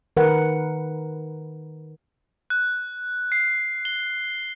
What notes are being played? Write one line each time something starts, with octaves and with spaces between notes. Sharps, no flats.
D#3 A#4 B4 F#5
F#6
C7
G7